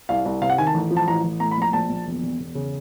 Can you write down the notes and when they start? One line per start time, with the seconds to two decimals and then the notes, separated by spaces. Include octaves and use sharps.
0.09 C2 F5
0.25 C2
0.41 C3 F5
0.50 F#5
0.58 D#3 G#5
0.67 A5
0.74 A1
0.91 F3
0.97 A5
1.08 A1 A#5
1.24 A1
1.40 A2 A#5
1.51 B5
1.57 A#1 A#5
1.73 A#1 A5
1.89 A#1
2.06 E1
2.22 E1
2.40 E1
2.55 C#3